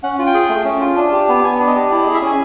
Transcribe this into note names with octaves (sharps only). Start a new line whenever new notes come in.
C#4 F#5
F4
G5
G#4
A3
C#4
F4
D4
G4
B3
B3 G#5
D4
D#5
G4
E4 D5
D#5
G#4
E5
C#4 G#5